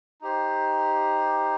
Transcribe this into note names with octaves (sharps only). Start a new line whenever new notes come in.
D#4 G4 C5